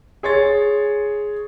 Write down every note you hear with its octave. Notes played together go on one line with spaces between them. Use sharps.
G#4 C#5 C6 A6